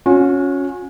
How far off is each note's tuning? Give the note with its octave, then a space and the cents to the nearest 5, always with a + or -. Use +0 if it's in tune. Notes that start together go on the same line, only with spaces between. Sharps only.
C#4 +0 F#4 -40